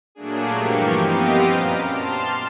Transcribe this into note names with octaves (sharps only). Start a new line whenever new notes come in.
A#2 F#3 A3 A#3 D4 G#4
G2 E3 F3 A#3 G4 C#6
B3 C4 G4 D#5 F5
F#2 A#2 A#5 D6
A5 C6 F6